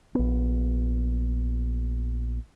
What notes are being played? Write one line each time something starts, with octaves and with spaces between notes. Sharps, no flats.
A#1 B3